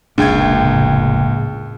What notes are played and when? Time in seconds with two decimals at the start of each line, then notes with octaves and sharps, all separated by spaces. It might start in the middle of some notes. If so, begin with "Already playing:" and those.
0.18 F1 C#2 A#2 D4 G#4 E5 G5 G#6
0.63 A2 C#3